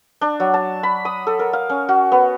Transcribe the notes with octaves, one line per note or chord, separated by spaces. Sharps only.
D4
F#3
A5
B5
D#6
A4
A#4
F5
C#4
F#4
B3